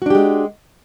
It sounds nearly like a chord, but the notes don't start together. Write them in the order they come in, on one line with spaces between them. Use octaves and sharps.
F#4 D4 G4 G#3